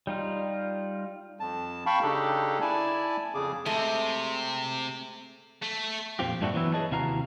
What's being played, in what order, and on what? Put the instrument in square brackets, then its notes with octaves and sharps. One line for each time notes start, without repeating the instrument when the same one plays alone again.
[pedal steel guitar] G3 D#4 F4
[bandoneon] F2 A5
F5 G5 A5 B5 C#6
C#3 D4 D#4 G4 A4
E4 D5 G#5 A5
F2 C#3 G#4 D6
[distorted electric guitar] C3 [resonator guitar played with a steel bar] G#3 A3
[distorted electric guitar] A3
[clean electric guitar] F2 A#2 C4 F4 G4
G2 A#2 A3 D4 E4 F#4
E3 F#3 B3 E4
G#4 B4 C#5 D#5 A5
D#2 C3 E4 F#4 F5 A#5